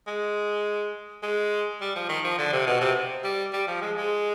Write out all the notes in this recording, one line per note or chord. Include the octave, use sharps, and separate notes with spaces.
G#3
G#3
G3
F3
D#3
F3
D3
C3
B2
C3
G3
G3
F3
G#3
G#3